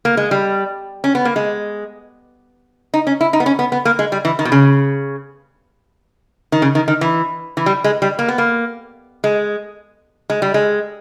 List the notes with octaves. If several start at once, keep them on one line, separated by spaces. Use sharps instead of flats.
A#3
G#3
G3
C#4
B3
A#3
G#3
D#4
C#4
E4
D#4
B3
C#4
B3
B3
A#3
G#3
G3
E3
D#3
B2
C#3
D#3
C#3
D#3
D#3
E3
E3
G3
G#3
G3
A#3
B3
A#3
G#3
G#3
G3
G#3